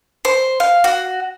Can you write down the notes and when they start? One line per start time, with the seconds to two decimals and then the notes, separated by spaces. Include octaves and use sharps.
0.25 C5
0.60 F5
0.84 F#4